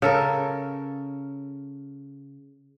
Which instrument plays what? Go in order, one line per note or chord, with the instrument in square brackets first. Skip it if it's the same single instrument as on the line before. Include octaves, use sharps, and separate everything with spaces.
[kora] C#3 A4 A#4